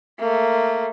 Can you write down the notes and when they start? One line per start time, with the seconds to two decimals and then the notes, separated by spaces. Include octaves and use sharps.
0.19 A3 A#3